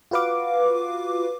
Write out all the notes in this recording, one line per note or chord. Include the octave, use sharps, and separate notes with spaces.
F4 F#4 B4 F5 D6